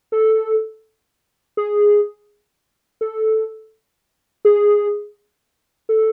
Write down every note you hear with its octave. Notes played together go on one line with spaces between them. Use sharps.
A4
G#4
A4
G#4
A4